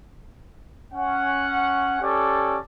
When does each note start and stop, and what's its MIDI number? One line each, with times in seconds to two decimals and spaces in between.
0.93 1.99 61
0.93 1.99 78
2.02 2.58 61
2.02 2.58 67
2.02 2.58 69
2.02 2.58 74